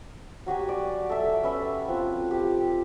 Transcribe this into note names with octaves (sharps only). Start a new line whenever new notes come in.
F#3 F#4 G4 G#5
D5
A4 E5
C#4 B4 E5
C4 F4 F#5
G4